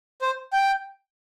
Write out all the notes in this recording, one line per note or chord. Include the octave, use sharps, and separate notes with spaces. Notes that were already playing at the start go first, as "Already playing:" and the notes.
C5
G5